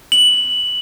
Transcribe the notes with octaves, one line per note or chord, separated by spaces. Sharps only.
F#7